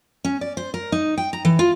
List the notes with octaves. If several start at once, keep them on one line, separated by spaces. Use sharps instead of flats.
C#4
D5
C5
A#4
D#4
G5
A#5
E3
F4